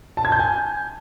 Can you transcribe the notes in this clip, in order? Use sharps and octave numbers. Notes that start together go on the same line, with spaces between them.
A5
G#6
G6
G#5